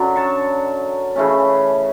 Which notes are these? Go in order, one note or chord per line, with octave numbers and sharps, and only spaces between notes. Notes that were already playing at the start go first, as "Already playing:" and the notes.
Already playing: F#2 D3 F#3
A5 C#6
C#3 E3 A3 C#4